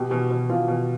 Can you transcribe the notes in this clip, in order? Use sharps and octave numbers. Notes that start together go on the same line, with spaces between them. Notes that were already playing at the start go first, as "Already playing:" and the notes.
Already playing: B2 G4
B2
B2
B2 F4
B2